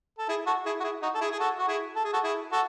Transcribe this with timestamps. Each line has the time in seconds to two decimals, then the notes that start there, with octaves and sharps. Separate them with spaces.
0.18 A4
0.29 E4 G#4
0.46 F#4 A4
0.66 E4 G#4
0.80 F#4
0.84 E4 G#4
1.02 D#4 F#4
1.15 A4
1.21 E4 G#4
1.31 G#4
1.40 F#4 A4
1.58 F#4
1.68 E4 G#4
1.96 A4
2.04 G#4
2.13 F#4 A4
2.24 E4 G#4
2.52 F#4 A4